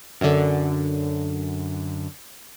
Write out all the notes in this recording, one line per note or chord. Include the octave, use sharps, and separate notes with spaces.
F#2 D3